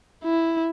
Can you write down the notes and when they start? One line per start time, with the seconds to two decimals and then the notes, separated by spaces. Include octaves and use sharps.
0.24 E4